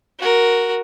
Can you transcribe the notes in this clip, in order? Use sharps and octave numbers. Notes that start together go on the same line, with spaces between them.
F#4 A#4